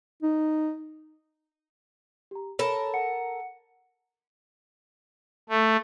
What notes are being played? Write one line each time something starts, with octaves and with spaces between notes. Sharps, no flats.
D#4
G4 A#5
A4 A#4 C#5 A5 B5
F#5 C#7
A3